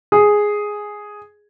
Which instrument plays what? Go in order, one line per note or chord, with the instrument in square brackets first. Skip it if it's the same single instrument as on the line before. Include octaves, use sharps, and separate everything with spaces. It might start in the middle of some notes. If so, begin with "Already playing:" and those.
[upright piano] G#4